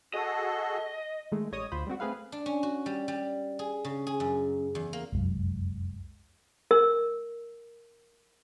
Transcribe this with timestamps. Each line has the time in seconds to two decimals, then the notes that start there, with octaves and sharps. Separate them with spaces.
0.14 F#4 G#4 A4 D#5
1.32 D#3 G#3 A3
1.52 A1 G3 C#5 D#5 D#6
1.72 D2 F4 C5 B5
1.86 G3 G#3 C4 F#4
2.00 A3 C4 G#4 B4 F5
2.32 D4
2.46 C#4
2.63 F#4
2.86 G3
3.08 G3
3.59 G#4
3.85 C#3
4.07 G#4
4.20 F#2
4.75 E2
4.93 A#3
5.13 F1 C2 F#2 G#3
6.71 A#4 E6